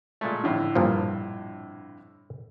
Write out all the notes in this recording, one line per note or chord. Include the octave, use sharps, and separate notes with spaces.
A#2 G#3 A3
F2 A2 D3
G2 A#2 F3